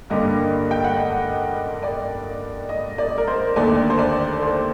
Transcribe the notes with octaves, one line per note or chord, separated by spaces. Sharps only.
G2 D3 G3 A#3 D#5
G5
F#5
D#5
D5
D#5
D5
A#4
C5
D#2 D3 A3 D5
C5
D5
C5